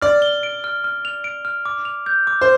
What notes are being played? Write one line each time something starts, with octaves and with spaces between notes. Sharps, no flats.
D5 F6
G7
D7
F6
F6
F7
D7
F6
D6
F7
G6
D6
C5